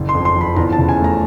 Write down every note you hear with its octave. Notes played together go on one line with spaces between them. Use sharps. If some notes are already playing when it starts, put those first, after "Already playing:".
Already playing: F#1
C6
F2
C6
F3
B5
E2 A#5
A5
C#3
G#5
A3
A#5